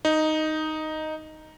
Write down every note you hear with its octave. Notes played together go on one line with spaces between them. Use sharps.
D#4